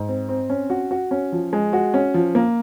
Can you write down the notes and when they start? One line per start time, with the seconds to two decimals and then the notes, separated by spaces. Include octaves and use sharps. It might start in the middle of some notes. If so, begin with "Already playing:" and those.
Already playing: G#2
0.08 C4
0.29 C4
0.50 C#4
0.70 F#4
0.91 F#4
1.11 C#4
1.32 F3
1.53 G#3
1.73 F#4
1.94 C#4
2.14 F3
2.35 A#3